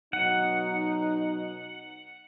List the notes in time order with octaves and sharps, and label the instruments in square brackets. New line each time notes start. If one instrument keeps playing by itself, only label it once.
[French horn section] B2 F#3 D#4 [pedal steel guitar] F#5